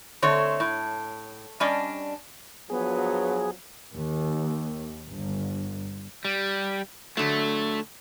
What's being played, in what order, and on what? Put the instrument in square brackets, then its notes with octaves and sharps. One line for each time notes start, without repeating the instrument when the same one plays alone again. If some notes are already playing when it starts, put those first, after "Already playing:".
[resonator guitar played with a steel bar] D3 A3 C4 C#5
A2
G3 C#4 D4 D5 D#5
[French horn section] G2 F3 F#3 [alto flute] B3 [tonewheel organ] G#4
[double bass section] D#2
G1
[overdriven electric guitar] G3
[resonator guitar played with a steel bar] D3 F#3 [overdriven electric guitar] A3